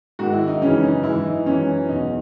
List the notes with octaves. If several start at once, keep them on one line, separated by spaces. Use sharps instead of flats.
G#2 D#3 F#4
E4
D#4
F#2 C#3 E3 C#4
D#4
G#2 E3 E4
D#4
F#2 E3 C#4
E2 B2 D#4